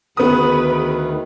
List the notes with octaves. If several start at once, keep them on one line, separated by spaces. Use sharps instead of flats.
D2 D#3 B3 G#4 B4 D#6